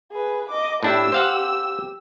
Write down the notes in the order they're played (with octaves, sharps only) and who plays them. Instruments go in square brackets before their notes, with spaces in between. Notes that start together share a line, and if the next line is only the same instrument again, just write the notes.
[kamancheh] G#4 B4
D#5 D6
[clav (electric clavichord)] A2 D4 E4 [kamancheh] G4 E6
[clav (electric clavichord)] C5 F5 F#5